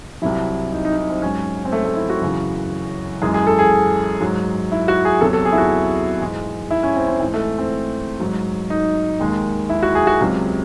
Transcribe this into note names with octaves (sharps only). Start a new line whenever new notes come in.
C2 C3 F#3 E4
D#4
D#4
D#4
C4
G#2 F#3 C#4
C4
A3
A3
E4
F#4
F#2 C#3 E3
F#2 E3 G#3 G#4
G#4
A4
G#4
G#2 F#3
E4
F#4
G#4
E2 C3 F#3 A4
A4
G#4
E4
F#4
G#2 E3 G#3
E4
C#4
C4
C4
G#2 E3 G#3 C4
A3
C4
G#2 F#3
D#4
D#2 D#3 G#3
E4
F#4
G#4
F#4
C#2 C3 F#3